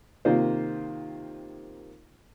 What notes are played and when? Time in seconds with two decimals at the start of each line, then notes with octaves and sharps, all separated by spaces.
0.25 C3 D#3 A#3 F4 C5